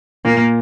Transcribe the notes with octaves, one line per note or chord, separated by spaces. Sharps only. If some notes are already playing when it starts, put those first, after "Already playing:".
A#2 A#3